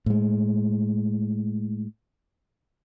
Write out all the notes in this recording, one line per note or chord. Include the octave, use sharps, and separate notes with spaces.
A2 G#3